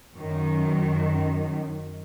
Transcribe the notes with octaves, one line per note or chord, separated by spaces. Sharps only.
F#2 D#3